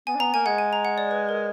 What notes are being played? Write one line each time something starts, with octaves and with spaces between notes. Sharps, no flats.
B3 G#5
D4
B3 A#5
A#3 G#5
G#3 F#5
G#5
A#5
F#5
D5
B4
A#4